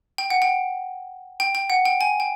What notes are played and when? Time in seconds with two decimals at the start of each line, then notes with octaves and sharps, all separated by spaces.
0.18 G5
0.30 F#5
0.42 G5
1.40 G5
1.55 G5
1.70 F#5
1.85 G5
2.01 G#5
2.20 G5